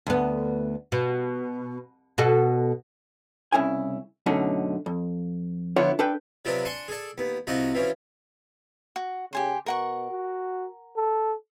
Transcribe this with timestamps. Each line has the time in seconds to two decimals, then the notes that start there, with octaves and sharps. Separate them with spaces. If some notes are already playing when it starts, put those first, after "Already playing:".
0.07 D2 B3
0.92 B2
2.18 B2 F#4 A4
3.52 C2 C#3 E4 G#5
4.26 F#2 B2 D3 A3 C#4 D#4
4.86 F2
5.76 D3 F3 B3 E4 F4 C#5
5.99 D4 A4 B4 G5
6.45 C3 F3 F#3 B3 D4
6.65 D4 G#5 C6 C#6
6.88 G#4 A4 D5
7.18 D#2 B3
7.47 C2 C3 F3 F#4 D#5
7.74 B2 E3 F3 C#4
8.96 F#4
9.33 C#3 G4 G#5 C6
9.66 B2 A#4 F#5 C#6
10.10 F#4
10.96 A4